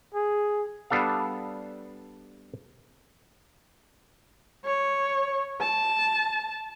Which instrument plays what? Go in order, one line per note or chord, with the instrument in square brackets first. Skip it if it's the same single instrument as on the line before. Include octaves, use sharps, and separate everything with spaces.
[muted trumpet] G#4
[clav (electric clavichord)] G3 B3 D4 A4 F5
[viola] C#5
A5